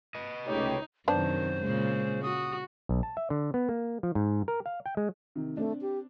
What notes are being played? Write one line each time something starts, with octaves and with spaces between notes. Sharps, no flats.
B4 D#5
C#2 A3 D#4 G4 C#5
F#2 C3 D#3 B3 D4 C5
A#2 C#3 G#3
F#4 D#6
B1
A5
E5
D3
B3
A#3
F3
G#2
A#4
F5
G5
G#3
C3 D#3
A3 C4 D4
G4